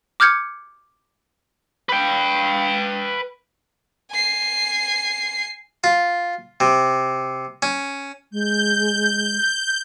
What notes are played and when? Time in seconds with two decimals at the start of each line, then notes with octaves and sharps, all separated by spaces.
0.20 D6 F6 G6 G#6 C#7
1.89 B4 G5
4.12 G#5 C7
5.84 F4
6.60 C3
7.62 C#4
8.32 G#3 G6